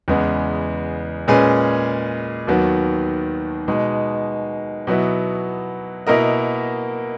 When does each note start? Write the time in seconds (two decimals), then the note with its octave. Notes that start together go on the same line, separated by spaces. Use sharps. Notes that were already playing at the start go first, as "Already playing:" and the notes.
0.08 E2 C#3 G#3 B3
1.28 A#2 G#3 C#4 G#4 B4
2.47 D#2 D#3 F#3 B3
3.68 B2 G#3 D#4
4.87 B2 F#3 B3 E4
6.07 B2 A#3 E4 A#4 D#5